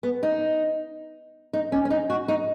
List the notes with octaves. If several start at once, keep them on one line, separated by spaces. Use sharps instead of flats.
B3
D#4
D#4
C#4
C#4
D#4
F#4
D#4